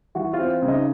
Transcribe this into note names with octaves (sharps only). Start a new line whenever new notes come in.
E3 F#4 F#5
F4 F5
C4
C#3
D#4 D#5